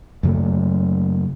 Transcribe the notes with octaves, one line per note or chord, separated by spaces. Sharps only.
F#2 C#3 F#3 A3